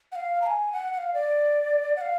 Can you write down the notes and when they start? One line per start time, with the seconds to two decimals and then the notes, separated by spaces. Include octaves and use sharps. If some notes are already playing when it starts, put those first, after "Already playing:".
0.12 F#5
0.15 F5
0.42 A#5
0.46 G#5
0.73 F#5
0.93 F#5
0.98 F5
1.14 D5
1.96 F#5
2.01 F5